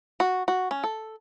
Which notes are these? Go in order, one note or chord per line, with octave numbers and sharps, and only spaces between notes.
F#4
F#4
C#4
A4